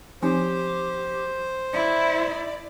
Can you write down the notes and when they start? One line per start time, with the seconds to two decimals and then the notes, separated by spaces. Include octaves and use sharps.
0.22 F3 C4 D#4 G4 C5
1.73 E4 D5